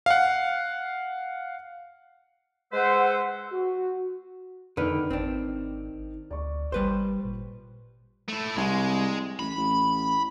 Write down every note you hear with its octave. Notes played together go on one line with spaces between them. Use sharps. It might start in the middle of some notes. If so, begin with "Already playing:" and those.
F5 F#5
G#3 B4 C5 F#5 E6
F#4
F2 D3 D#3 B4 F6
G#1 C4 D4
D2 D5 C#6
G#1 G3 B4 C5
A#2
A3 E4
C2 G#3
A1 B5
A1